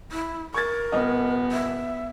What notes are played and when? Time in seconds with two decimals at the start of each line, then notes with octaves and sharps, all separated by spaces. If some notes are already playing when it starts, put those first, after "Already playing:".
0.12 E4
0.54 A#4 C#6 G#6 A6
0.92 D#1 B3 D#5
1.52 E5